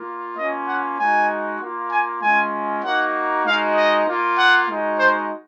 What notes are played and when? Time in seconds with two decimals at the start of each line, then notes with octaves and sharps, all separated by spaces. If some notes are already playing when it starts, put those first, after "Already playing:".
Already playing: A#3 F4
0.37 A#3 C#4 F4 D#5
0.68 F#5
0.99 G#3 D#4 F#4 G#5
1.61 A#3 F4
1.91 G#5
2.22 G#3 C#4 F4 G#5
2.83 A#3 D#4 F#4 F#5
3.45 G#3 D#4 F#4 F5
3.76 D#5
4.07 A#3 F4
4.38 F#5
4.69 G#3 D#4 F#4
4.99 C5